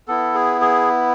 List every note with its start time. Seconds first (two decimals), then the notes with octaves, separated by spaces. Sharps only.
0.08 B3 E4 A4
0.34 G#4
0.61 G#4